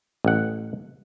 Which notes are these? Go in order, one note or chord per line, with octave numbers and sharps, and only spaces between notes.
A1 F#5